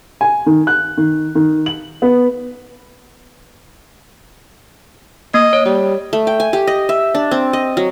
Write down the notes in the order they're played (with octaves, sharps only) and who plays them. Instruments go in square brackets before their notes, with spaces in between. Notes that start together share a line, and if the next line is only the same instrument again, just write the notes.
[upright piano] G#5
D#3
F#6
D#3
D#3
F#7
B3
[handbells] A#3 [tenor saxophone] D#5
[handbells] C#5
[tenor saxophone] G3
[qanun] A3
G5
G#5
G4
D#5
E5
D4
C4
D#5
F#3